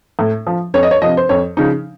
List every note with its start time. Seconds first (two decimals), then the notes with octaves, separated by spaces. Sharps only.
0.19 A2
0.47 F3
0.74 F2 C#5
0.83 D#5
0.91 C#5
1.02 C3 F3 D#5
1.17 C5
1.29 F2 C#5
1.57 C#3 F3 D#4